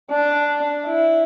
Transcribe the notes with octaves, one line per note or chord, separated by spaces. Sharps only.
D4
E4